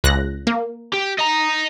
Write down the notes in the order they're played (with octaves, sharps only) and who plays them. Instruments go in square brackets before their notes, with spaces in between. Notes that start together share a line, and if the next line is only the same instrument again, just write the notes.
[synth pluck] C#2 F#6 A#6
A#3
[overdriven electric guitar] G4
D#5 A#5